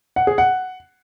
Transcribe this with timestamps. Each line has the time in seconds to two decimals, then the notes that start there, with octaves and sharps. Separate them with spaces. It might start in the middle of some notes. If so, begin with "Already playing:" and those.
0.16 F#5
0.27 G#4
0.38 F#5